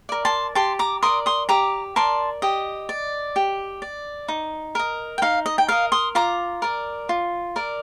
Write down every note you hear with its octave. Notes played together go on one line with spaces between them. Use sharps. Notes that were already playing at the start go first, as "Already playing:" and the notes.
A#4 D5
A5 C6
G4 A5 C6
A#5 D6
A#4 D5 C6 D#6
C6 D#6
G4 A#5 D6
A#4 D5 A5 C6
G4 D#5
D5
G4
D5
D#4
A#4 D#5
G5
D#4 F5
D#5
G5
A#4 D#5 F5
C6 D#6
F4 A#5 D6
A#4 D5
F4
A#4 D5